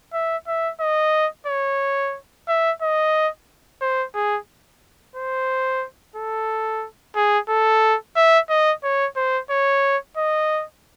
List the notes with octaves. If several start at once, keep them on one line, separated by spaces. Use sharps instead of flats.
E5
E5
D#5
C#5
E5
D#5
C5
G#4
C5
A4
G#4
A4
E5
D#5
C#5
C5
C#5
D#5